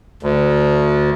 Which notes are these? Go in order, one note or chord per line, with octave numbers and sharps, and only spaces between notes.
D2